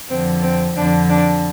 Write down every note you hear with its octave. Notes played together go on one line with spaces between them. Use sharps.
F2 D3 F3 C4
C4
F2 D3 F3 D4
D4